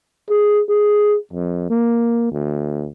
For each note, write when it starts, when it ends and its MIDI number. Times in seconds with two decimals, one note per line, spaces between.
0.30 0.61 68
0.69 1.17 68
1.33 1.66 41
1.70 2.29 58
2.32 2.89 38